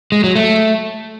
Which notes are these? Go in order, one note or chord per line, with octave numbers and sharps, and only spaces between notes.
G#3
F#3
A3